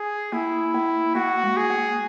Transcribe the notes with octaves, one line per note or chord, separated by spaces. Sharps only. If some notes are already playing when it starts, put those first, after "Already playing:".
Already playing: G#4
A#3 E4
A#3
A#3 F#4
G#3
G#4
A#3